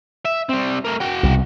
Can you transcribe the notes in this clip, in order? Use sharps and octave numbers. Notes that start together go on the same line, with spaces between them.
E5
G3 C4
A3 A#4
F#4 G5
C2 B2